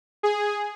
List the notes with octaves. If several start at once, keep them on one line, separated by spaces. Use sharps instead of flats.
G#4